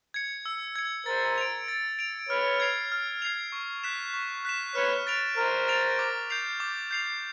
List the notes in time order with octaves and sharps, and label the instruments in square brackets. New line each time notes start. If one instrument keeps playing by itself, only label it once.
[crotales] G#6 C#7
E6
G#6 C#7
[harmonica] A#4 C5 [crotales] A6
[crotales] D7 F7
A6
D7 F7
[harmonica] B4 C#5 [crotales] F6
[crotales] G#6 C7 F7
F6
G#6 C7 F7
C#6
F#6 B6 E7
C#6
F#6 B6 E7
[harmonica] B4 C#5 [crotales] F6
[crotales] A6 D7 F7
[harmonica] A#4 C5 [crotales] F6
[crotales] A6 D7 F7
D6
G6 C7 F7
D6
G6 C7 F7